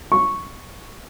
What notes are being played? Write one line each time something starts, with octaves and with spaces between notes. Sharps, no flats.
C#6